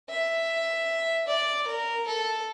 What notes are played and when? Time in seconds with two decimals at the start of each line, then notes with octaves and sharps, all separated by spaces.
0.10 E5
1.28 D5
1.68 A#4
2.07 A4